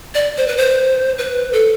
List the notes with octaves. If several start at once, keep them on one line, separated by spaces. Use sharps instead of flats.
D5
C5
B4
C5
B4
A4